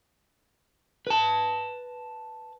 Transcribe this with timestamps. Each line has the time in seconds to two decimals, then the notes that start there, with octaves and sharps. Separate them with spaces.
1.07 B4 A5